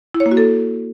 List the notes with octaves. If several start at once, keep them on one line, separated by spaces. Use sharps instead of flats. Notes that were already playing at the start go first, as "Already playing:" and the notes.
E4
C#5
A#3
F#4
A4